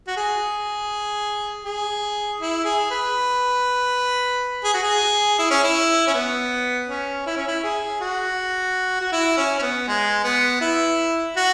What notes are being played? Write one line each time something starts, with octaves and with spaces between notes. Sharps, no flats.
F#4
G#4
G#4
E4
G#4
B4
G#4
F#4
G#4
E4
C#4
E4
C#4
B3
C#4
E4
C#4
E4
G#4
F#4
F#4
E4
C#4
C#4
B3
G#3
B3
E4
F#4